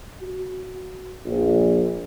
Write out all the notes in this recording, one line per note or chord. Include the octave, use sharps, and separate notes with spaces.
F#4
A#1